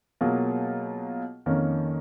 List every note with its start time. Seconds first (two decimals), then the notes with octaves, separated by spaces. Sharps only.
0.21 B2 F#3 A#3 F4 G#4
1.46 F2 D#3 A#3 C#4